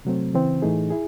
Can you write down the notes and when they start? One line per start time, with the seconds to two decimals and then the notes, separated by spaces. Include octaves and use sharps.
0.05 C3 F#3 A3 C4
0.34 C#3 E3 C4
0.62 A2 E3 A3 D#4 G#4
0.90 E4 G#4